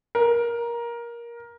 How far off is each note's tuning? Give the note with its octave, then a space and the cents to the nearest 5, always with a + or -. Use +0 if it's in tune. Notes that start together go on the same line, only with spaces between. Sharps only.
A#4 +15